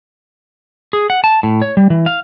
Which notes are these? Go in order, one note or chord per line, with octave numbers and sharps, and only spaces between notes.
G#4
F#5
A5
A2
C#5
G3
E3
F5